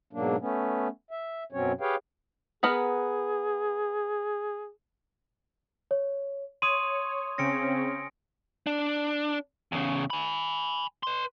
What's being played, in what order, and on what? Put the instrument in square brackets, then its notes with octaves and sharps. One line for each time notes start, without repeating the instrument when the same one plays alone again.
[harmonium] G#2 B2 F#3 A#3 D4
A3 B3 C#4
E5
F#2 B2 F#3 C4 C#4 C#5
G4 G#4 B4 C#5 F5 G5
[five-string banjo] B3 A#4 B4 [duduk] G#4
[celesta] C#5
[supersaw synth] C#5 [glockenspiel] C6 D#6 [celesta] D#7
[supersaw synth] C#3 C4 C#4 [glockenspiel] A#6 C#7 D7
[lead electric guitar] D4
E2 C#3
G#5 B5
B4 C6